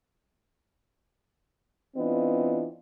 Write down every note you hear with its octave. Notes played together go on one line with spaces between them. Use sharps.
E3 B3 C4 D4 F4 D#5